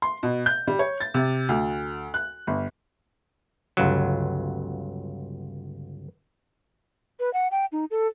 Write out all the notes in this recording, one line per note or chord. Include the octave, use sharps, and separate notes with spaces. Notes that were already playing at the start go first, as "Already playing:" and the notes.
C6
B2
G6
G3
C#5
A6
C3
D2
F#6
G1
G1 C#2 F#3
B4
F#5
G5
D#4
A4